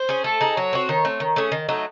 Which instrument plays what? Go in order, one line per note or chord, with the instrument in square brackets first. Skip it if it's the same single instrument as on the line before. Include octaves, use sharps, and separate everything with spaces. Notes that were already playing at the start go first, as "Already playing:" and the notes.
Already playing: [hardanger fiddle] C5
[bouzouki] C#4 G#4
[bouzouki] A3 [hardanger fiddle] A4
[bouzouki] D#4 G#4
[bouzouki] F#3 [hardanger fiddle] C#5
[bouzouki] C4 F#4
[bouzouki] D#3 [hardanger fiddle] C#5
[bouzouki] A3 C4
D#3
A3 C#4 G#4
D#3
F#3 A3 D#4